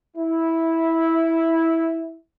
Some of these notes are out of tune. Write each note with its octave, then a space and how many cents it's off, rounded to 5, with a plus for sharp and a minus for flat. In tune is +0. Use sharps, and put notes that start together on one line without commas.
E4 -10